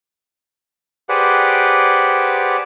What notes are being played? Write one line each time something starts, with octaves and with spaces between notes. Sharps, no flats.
G4 G#4 B4 C5 D5 F#5